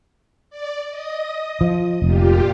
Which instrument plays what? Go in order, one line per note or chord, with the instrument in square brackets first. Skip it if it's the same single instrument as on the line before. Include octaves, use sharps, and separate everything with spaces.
[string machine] D5
D#5 D#6
[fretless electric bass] F3
[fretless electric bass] F1 [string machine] A#2 F4 G4